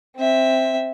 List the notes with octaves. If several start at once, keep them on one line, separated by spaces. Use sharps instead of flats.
C4 E5